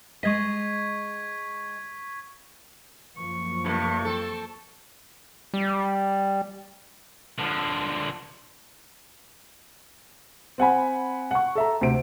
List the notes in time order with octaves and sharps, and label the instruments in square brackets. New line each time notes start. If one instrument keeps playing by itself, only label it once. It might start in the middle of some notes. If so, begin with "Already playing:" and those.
[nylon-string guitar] G#3 D#5 [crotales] C#6 G#6 B6
[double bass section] F#2 F3 A#3 [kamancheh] C#6
[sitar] G2 C3 A3
C4 A4
[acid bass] G3
[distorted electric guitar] D3 F3
[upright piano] C4 F#5 G#5 B5
F#5 C#6
A4 E5 A#5
D2 C3 D7